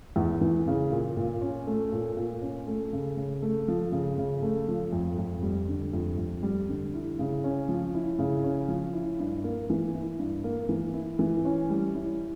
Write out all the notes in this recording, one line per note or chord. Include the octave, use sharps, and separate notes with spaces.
E2
E3
C#3
A#2
A#2
C#4
A3
A#2
A#2
C#4
A3
C#3
C#3
A3
F3
C#3
C#3
A3
F3
F2
F2
G3
D3
F2
F2
G3
D3
E4
C#3
C#4
F3
E4
C#3
C#4
F3
E4
G2
A#3
E3
E4
G2
A#3
E3
E4
E3
C#4
G3
E4